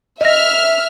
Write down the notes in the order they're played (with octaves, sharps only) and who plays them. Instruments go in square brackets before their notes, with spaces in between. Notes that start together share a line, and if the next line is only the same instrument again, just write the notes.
[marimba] D#5 A#6 [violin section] E5 F6